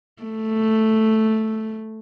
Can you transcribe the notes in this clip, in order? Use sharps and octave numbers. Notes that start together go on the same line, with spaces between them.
A3